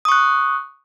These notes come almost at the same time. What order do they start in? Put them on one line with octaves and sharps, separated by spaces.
D#6 C#6 F#6